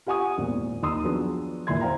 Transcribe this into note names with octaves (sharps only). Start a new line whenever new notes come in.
F4 G4 F#5 G#5 C#6 D#6
G#1 E2 A#2
D#2 D#4 C6 D#6 E6
F3 F#3 B3 D4 G#4
D#2 A#2 E3 E5 C6 G#6
C5 F5 G5 A#5